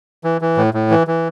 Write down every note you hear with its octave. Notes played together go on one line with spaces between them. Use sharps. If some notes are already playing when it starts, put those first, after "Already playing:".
E3
E3
A2
A2
E3
E3